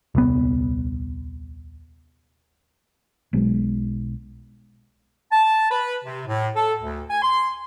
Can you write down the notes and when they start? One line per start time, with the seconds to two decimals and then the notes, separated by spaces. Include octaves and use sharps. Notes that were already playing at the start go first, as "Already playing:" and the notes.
0.15 D#1 C2 B3
3.33 B1 B2 F#3 G#3
5.31 A5
5.70 B4
6.04 C3
6.27 A2
6.56 A4
6.80 D2
7.10 G#5
7.23 C6